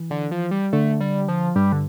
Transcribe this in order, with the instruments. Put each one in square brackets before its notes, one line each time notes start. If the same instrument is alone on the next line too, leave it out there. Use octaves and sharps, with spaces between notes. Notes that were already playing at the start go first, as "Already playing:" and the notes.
Already playing: [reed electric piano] E3
[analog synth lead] D3
F3
G3
[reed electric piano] D3 [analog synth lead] A3
[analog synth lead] G3
F3
[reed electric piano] G2 [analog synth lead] G3
[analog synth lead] D3